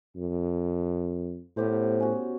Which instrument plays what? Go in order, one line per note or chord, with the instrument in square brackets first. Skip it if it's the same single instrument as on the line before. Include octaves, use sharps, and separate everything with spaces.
[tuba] F2
[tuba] A2 [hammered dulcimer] B3 G4 C5
[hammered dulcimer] C#4 F#4